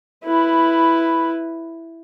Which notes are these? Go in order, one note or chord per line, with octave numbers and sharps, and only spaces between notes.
E4 B4